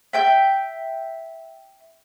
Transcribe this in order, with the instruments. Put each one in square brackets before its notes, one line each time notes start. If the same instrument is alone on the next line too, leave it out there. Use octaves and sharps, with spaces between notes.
[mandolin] E5 G5 G6